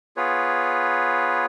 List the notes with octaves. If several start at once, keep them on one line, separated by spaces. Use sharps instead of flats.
B3 F4 G#4 B4 C#5